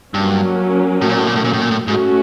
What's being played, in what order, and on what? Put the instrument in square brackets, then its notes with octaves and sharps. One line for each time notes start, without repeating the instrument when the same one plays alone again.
[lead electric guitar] G2 [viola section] F#3 A#3 C#4
[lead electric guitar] A2
A#2
A2
A#2
A2
A#2
A2
A#2
A2
[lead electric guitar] G#2 [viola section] A3 C#4 F#4